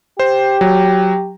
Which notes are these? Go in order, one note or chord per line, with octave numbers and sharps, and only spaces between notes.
G4 C5
F#3